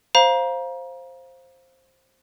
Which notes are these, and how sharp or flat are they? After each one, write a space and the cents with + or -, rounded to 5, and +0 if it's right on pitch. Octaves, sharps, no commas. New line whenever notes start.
C5 +10 F5 +0 A#5 +30